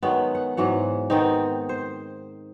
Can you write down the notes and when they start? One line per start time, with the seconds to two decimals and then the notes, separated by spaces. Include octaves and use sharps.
0.03 D#3 F#3 G#3 B3
0.35 F#5
0.57 G#2 E3 F#3 F#5
1.10 D#3 B3 C4 D#4
1.69 C5